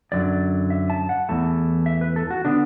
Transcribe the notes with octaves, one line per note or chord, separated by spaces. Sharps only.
F#2 D3 F#3 D5
E5
A5
F#5
E2 E3 A3 A5
E5
B4
A4
F#4
D3 B3 D4